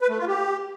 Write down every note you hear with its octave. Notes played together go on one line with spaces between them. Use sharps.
B4
A3
F4
G4